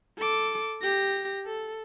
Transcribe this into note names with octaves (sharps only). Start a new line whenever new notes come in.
A4 D6
G4 A#6
A4